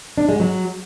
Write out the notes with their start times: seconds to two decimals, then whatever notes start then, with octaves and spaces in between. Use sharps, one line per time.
0.18 D4
0.29 G#3
0.40 F#3